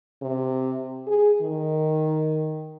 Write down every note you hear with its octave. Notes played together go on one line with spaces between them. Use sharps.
C3
G#4
D#3